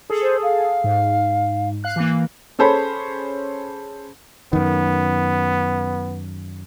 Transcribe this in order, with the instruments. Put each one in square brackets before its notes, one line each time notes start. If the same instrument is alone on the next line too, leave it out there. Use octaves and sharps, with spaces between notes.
[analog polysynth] G#4 A4
[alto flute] C5
F5
[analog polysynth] G#2
F5 F#6
E3 A#3
[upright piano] C#4 G#4 A4 C5 C#5 B5
[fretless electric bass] F#2 D#3 [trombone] B3